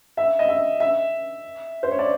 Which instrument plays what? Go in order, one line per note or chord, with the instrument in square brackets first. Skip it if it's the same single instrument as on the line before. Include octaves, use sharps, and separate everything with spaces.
[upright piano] E5
D#5
E5
E5
C5
C#5
D5